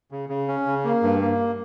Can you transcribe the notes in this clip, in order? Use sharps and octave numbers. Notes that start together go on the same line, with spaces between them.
C#3
C#3
C#4
C#3
A#3
G2
A#3